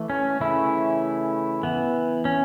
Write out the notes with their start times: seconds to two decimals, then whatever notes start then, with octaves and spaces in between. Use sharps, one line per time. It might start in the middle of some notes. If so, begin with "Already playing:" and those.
Already playing: E3 A3
0.10 C#4
0.40 C#3 E3 A3 C#4 E4
1.63 E3 B3
2.25 C#4